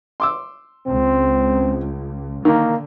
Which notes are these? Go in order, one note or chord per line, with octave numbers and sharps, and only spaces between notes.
C6 D6 E6
C#2 C4
D3 D#3 A#3